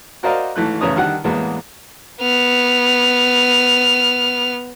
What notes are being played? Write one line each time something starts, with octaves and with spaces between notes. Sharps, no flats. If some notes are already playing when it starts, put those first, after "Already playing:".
F#4 A#4 C5 D5 D#5 F5
G#1 E3 A3 F#6
A1 C#3 B4 C#5 A#5 D#6
D3 D#3 G3 F#5
A1 E2 G#3 A#3 B3
B3 F6